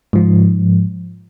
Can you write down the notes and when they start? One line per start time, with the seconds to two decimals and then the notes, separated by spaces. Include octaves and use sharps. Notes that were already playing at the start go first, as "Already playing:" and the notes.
0.13 G#2 F3